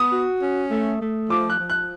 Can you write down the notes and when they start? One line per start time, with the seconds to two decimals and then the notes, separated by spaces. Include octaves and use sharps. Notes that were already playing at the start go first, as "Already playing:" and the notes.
Already playing: B3 D#6
0.11 F#4
0.41 C#4
0.70 A3
1.00 A3
1.30 F3 D6
1.50 F#6
1.60 F3
1.70 F#6